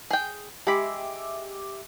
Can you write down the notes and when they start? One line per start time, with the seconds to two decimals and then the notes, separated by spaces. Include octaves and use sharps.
0.11 G#4 G5
0.67 G#3 G4 E5 B5 D6